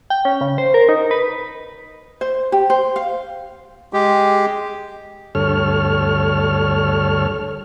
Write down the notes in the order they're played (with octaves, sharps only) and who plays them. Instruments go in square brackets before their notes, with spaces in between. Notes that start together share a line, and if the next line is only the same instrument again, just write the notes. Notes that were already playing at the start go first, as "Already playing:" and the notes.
[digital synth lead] G5
C#4
C#3
C5
A#4
D#4
B4
[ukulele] C5
G4
C5
F5
[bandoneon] G#3 G4
[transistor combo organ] D2 G2 A4 C#5 F6